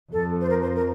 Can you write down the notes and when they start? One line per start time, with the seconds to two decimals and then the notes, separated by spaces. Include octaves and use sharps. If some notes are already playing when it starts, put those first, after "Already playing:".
0.12 F2 A4
0.41 C5
0.49 A#4
0.62 C5
0.75 A#4